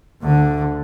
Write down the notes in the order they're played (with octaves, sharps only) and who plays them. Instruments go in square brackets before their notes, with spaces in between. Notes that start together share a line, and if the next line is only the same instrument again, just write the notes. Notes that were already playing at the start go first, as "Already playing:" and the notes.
[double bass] D2 D3